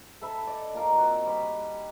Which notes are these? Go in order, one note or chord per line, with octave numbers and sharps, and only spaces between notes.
A4 E5 B5
D5 D#5
A#2 D#4 A#4 F5
C4 F#4
G3 B5